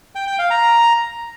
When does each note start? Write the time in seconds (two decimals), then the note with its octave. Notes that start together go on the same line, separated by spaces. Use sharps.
0.15 G5
0.27 G5
0.39 F5
0.51 A#5